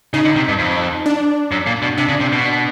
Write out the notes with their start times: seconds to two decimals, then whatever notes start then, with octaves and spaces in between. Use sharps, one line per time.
0.14 C#3 D#4
0.25 D3
0.36 C3
0.48 G2
0.59 F2
1.06 D4
1.51 F#2
1.67 A#2
1.82 B2
1.98 C3 D4
2.09 C#3
2.21 C3
2.32 B2